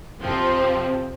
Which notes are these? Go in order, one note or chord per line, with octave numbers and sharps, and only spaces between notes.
F2 C3 F3 C4